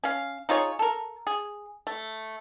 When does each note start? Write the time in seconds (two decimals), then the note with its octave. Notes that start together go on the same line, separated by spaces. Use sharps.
0.04 C#4 F5
0.49 D#4 F4 G#4 C#5
0.79 A4 A#4
1.27 G#4
1.87 A3